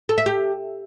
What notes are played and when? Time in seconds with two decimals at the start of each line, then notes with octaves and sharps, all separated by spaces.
0.09 A4
0.18 E5
0.26 G4